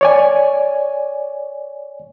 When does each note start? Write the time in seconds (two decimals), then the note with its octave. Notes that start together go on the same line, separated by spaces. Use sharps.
0.01 C#5 D5 G#5